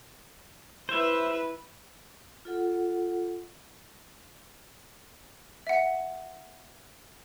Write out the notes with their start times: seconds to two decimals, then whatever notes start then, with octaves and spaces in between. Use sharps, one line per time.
0.89 E4 B4 C5 E5
2.45 F4 A4 F#5
5.67 E5 F#5